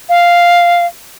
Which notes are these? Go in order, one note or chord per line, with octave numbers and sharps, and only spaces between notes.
F5